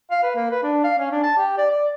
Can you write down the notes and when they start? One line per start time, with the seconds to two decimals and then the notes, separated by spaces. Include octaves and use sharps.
0.11 F5
0.23 B4
0.36 A#3
0.51 B4
0.63 D4
0.84 F5
0.98 C#4
1.12 D4
1.23 A5
1.38 G4
1.58 D5
1.71 D5